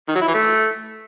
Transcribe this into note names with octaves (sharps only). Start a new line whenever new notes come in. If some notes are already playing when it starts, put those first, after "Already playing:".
D#3
F#3
E4
E3
A3